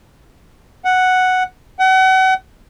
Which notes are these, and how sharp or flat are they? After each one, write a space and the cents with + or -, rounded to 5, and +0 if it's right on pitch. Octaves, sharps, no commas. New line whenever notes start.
F#5 +0
F#5 +35